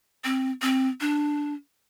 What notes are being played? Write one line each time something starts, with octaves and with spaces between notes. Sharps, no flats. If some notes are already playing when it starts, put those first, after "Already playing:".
C4
C4
D4